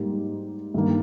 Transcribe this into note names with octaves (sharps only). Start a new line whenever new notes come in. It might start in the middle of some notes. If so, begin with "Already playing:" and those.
Already playing: G#2 G3 A#3 D#4 G4
G2 D#3 A#3